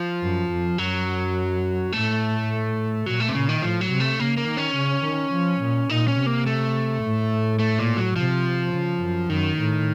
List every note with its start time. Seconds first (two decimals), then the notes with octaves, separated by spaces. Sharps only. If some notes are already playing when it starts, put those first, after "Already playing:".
Already playing: F3
0.22 F#2
0.50 F2
0.78 F#2 F#3
1.92 A2 A3
3.06 A#2 F#3
3.20 A3
3.29 C3
3.34 A#2 C#3
3.49 D#3
3.62 A2 F3
3.81 F#3
3.90 C3
4.00 A3
4.19 C#3 A#3
4.37 A#3
4.47 D#3
4.57 C#4
4.76 C#3
5.04 D#3
5.32 F3
5.61 A#2
5.89 A#2 D#4
6.08 C#4
6.18 C3
6.26 A#3
6.46 A3
7.03 A2
7.59 A3
7.79 A#2
7.96 F#3
8.16 C3 F3
8.73 C#3
9.01 F#2
9.29 F#2 D#3
9.58 A2